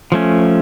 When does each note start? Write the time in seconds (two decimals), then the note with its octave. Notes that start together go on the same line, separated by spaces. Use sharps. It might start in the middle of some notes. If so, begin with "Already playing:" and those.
0.12 F3 A3 C#4